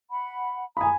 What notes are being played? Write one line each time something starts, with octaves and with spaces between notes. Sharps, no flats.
F#5 B5
G#5 A#5 B5 D#6